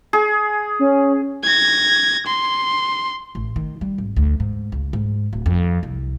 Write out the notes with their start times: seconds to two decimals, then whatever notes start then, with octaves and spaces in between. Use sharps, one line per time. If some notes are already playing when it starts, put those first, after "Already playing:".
0.13 G#4
0.79 C#4
1.44 G#6 A#6
2.26 C6
3.35 A1
3.56 D#3
3.81 G3
3.98 G#1
4.16 D2
4.40 G#2
4.72 C#2
4.93 G#2
5.33 D1
5.46 F2
5.83 C2